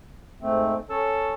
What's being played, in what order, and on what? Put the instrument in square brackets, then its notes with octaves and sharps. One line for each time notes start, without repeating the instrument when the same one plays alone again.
[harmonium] G#2 A3 C4
[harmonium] C#4 C#5 [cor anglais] A4